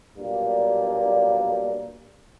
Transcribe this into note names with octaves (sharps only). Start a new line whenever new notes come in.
B1 G2 A#2 A#3